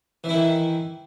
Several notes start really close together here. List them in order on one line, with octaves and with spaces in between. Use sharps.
E3 E4 D#3